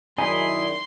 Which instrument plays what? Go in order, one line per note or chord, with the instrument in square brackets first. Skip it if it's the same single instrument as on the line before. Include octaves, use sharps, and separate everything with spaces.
[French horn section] F#2 D#3 D5 [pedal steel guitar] D#4 E4 G#4 [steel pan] G#5 [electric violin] C6